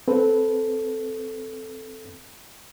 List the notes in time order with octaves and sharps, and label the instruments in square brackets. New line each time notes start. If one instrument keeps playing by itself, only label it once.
[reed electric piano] C4 A4 B4